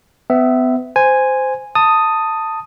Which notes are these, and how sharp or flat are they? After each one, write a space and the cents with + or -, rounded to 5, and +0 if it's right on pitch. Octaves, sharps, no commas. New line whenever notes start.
B3 +35 E5 +0
C5 -15 G#5 -5
A5 +15 D#6 +0